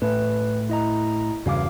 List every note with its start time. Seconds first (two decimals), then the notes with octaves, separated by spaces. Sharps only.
0.02 A2 B4
0.69 E4 D#5 A#5
1.46 E2 G2 C#3 F#4 F5 D6